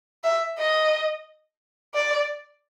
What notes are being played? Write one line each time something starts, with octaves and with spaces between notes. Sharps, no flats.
E5
D#5
D5